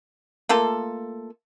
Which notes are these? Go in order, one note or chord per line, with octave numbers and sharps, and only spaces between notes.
A3 A#3 F4 A4